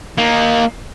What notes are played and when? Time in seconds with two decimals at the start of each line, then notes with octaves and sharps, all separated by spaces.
0.18 A#3 D#4